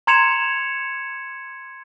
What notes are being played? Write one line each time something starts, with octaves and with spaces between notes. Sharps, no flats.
A#5 C6 G#6 C#7 E7 F7